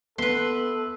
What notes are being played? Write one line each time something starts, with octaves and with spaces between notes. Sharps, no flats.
B3 A4 B4 E5 C6